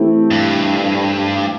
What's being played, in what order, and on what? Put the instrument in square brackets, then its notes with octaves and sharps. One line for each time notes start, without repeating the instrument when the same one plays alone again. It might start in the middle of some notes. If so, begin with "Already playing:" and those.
Already playing: [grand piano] E3 A3 C4 E4 G4
[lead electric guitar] G2